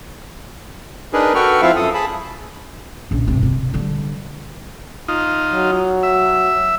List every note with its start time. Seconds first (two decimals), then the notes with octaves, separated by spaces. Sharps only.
1.13 D4 D#4 G#4 A#4 B4
1.35 F#4 A4 B4 G5 C#6 F6
1.62 F3 C4 E4 F4 E5 F5
1.76 F#2 A4 D#6
1.94 G#4 A5 B5
3.11 A#1 C#3
3.27 G2 C3
3.43 C3
3.74 D3 G3
5.08 D#4 F4
5.54 F#3
6.03 E5